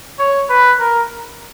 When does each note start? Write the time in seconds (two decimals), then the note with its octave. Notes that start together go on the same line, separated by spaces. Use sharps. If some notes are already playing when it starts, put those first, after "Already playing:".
0.19 C#5
0.50 B4
0.80 A#4